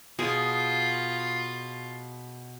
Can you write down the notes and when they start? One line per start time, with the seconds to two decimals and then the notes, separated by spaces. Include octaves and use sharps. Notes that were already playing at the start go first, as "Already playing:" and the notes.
0.19 B2 F4 G#4